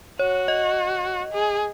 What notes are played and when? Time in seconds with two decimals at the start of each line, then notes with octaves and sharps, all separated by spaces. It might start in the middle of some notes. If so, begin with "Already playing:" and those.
0.19 F#4 C#5
0.48 D#5
1.33 G#4